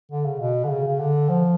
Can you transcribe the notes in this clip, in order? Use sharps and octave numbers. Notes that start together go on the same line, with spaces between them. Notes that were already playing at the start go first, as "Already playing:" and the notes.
D3
C#3
B2
D3
C#3
C#3
D3
F3